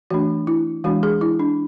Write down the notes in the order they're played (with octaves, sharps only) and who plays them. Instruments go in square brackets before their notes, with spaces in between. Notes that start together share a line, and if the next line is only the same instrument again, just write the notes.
[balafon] E3 A3 D4 F#4
E4
E3 G#3 D4 F#4
G#4
E4
D4